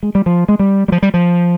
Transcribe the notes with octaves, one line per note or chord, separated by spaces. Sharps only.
G#3
G3
F3
G#3
G3
G3
F3
G3
F3